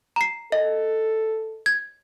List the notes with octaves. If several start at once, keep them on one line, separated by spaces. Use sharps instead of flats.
A#5 C7
A4 D#5
G#6